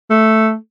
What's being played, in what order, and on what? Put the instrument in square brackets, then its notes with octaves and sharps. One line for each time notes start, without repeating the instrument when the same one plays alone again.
[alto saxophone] A3